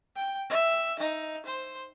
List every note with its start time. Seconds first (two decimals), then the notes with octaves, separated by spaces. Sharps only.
0.16 G5
0.50 E5
1.00 D#4
1.46 C5